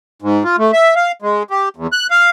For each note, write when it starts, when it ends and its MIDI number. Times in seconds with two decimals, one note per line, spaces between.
0.22 0.44 44
0.44 0.56 65
0.58 0.71 57
0.73 0.94 76
0.96 1.12 77
1.22 1.43 56
1.50 1.69 67
1.76 1.87 40
1.93 2.07 90
2.11 2.30 77